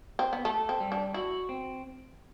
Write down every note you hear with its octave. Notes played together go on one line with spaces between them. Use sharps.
C4
B3
A3 A4
C4
G3
D4
E4 F#4
C4